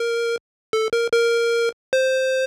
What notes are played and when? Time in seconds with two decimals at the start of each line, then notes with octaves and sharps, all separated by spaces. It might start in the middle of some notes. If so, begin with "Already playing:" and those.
Already playing: A#4
0.73 A4
0.93 A#4
1.13 A#4
1.93 C5